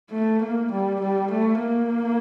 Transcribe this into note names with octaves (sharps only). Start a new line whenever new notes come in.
A3
A#3
G3
G3
A3
A#3